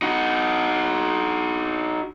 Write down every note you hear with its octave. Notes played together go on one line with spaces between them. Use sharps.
D#4 F#4